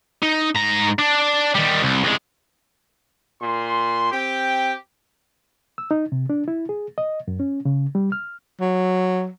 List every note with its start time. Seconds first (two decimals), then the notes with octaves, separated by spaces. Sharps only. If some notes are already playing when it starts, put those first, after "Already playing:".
0.23 D#4
0.56 G#2 A#5
0.99 D4
1.55 D#3 G3
1.82 C2
2.04 C2 G#3
3.40 A#2 C6
4.11 C4 G4 G5
5.78 E6
5.91 D#4
6.12 C3
6.30 D4
6.48 E4
6.69 G#4
6.98 D#5
7.28 F#2
7.40 C#4
7.65 C#3
7.95 G3
8.12 F6
8.61 F#3